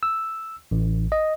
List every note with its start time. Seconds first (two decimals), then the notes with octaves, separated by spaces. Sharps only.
0.03 E6
0.71 A1
1.12 D#5